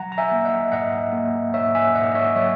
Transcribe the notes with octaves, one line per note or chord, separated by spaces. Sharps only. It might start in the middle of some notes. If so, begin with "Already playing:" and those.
Already playing: F#3 F#5 A#5
A#5
E5 G#5
A#3
E5
D#5 F#5
G#2 D#5 F#5
A#3
G#2 C#5 E5
E5 G#5
G#2 D#5 F#5
D#5
C#5 E5
F#3 C#5 E5